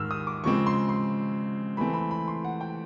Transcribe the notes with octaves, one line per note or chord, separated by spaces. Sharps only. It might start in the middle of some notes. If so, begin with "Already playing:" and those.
Already playing: G#2 D#3 G#3 E6 F6
D#6
D6
C#3 F3 G#3 C4 C#6
C6
C6
E3 A3 C4 B5
B5
B5
C6
F#5
G5